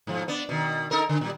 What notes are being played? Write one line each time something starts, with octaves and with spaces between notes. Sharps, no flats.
G#2 B2 F3
B3 D4
B2 D#3
D#4 A4 A#4
D3
A#2 G3